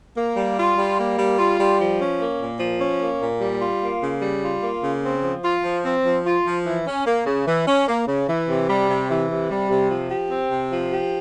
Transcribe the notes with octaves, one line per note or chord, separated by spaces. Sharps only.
A#3
G3
F4
G3
A#3
G3
F4
G3
F3
C#4
A#3
A#2
F3
C#4
A#3
A#2
G3
F4
A#3
C#3
G3
F4
A#3
C#3
C4
F3
F4
F3
C4
F3
F4
F3
E3
C#4
A#3
C#3
E3
C#4
A#3
C#3
E3
C3
G3
C3
E3
C3
G3
C3
F3
G4
C4
C3
F3
G4